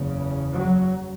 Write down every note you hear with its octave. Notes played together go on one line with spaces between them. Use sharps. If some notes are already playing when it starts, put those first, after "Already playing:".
Already playing: F#1 E2 C#3
F#3